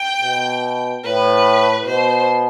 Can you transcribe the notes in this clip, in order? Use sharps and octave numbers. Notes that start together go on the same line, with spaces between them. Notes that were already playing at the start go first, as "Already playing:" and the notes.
Already playing: G5
B2
A2 B4
B2 C5